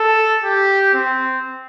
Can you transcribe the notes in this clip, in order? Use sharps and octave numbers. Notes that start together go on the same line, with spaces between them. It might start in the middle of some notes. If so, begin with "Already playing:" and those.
Already playing: A4
G4
C4